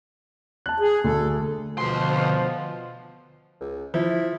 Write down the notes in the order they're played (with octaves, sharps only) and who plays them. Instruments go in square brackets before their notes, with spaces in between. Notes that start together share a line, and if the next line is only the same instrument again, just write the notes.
[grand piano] A5 F#6
[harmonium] G#4
[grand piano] D2 [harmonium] A4
[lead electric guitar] D2 C6 [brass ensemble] B2 F3
[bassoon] C#2
[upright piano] F3 [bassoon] E4